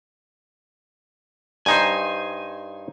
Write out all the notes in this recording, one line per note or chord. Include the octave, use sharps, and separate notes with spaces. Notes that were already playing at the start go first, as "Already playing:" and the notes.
G2 D#4 C5 G#5